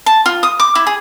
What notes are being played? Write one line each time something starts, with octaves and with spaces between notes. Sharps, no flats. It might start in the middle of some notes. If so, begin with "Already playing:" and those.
A5
F4
D#6
D6
E4
G#4